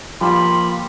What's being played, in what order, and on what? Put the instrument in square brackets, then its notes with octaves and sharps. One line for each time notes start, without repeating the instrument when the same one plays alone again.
[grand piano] F3 [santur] G3 A#3 [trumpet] B5 [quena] C6